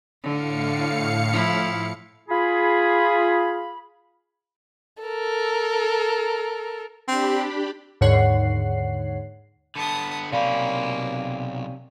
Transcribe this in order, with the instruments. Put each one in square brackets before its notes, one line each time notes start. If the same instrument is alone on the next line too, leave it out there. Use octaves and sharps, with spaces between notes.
[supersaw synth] A2 F5 C#7 [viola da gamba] D3
[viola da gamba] F3 E4
[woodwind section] F4 G#4 B5
[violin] A4 A#4
[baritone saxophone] C4 [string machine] D4 G4 B5
[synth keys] D#2 G#2 D3 C#5 F#5 C7
[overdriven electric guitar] D3 B3 [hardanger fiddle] A5 D#6
[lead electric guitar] B1 B5 [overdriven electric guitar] C3 C#4 [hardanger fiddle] A#3 [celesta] D5 F5